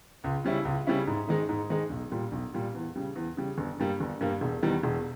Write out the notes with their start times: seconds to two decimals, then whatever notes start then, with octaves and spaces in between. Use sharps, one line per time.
0.24 C#2
0.44 C#3 G3 C#4 E4
0.65 C#2
0.87 C#3 G3 C#4 E4
1.07 G#2
1.28 D#3 G#3 D#4
1.49 G#2
1.70 D#3 G#3 D#4
1.90 B1
2.11 A#2 G3
2.32 B1
2.54 A#2 G3
2.74 E2
2.96 C#3 G3
3.15 E2
3.37 C#3 G3
3.58 G1
3.79 G2 G3 A#3
4.00 G1
4.20 G2 G3 A#3
4.41 E1
4.62 E2 D#3 G3
4.83 E1